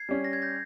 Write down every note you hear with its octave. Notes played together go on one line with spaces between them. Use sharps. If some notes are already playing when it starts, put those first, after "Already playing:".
Already playing: G#6 C7
G3 C#4
A#6
G#6
G6 A#6